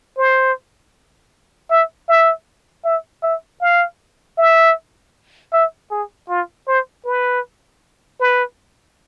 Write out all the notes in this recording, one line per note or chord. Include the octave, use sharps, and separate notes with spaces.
C5
E5
E5
E5
E5
F5
E5
E5
G#4
F4
C5
B4
B4